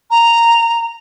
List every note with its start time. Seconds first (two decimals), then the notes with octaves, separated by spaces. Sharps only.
0.11 A#5